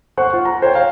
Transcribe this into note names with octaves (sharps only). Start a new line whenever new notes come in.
C5 F#5 C#6 F#6
F4
A#5
C5 C#5 G5
F5